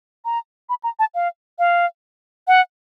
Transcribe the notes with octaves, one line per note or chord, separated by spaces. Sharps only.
A#5
B5
A#5
A5
F5
F5
F#5